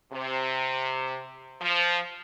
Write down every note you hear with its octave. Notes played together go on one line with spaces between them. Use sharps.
C3
F3